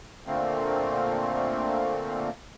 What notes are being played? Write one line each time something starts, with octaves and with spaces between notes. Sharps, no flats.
A#2 D3 A3 A#3 C4